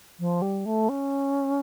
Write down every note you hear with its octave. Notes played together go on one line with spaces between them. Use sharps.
F3
G3
A3
C#4